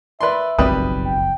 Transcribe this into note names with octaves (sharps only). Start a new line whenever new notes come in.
B4 D5 E5 C6
F#1 B1 F2 G3 C4 B4 D#6
G5